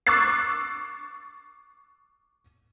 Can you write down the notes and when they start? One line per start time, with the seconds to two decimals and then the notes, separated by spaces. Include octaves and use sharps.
0.07 C#6 D6 E6 F#6 A6 C7